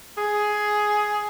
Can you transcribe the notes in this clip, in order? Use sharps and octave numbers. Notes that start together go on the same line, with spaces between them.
G#4